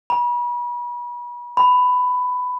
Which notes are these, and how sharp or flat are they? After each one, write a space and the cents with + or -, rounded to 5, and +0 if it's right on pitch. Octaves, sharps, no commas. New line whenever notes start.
B5 -35
B5 +15